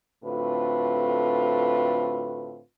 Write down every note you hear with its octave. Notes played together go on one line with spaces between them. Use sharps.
A2 D3 C4 F4 F#4 B4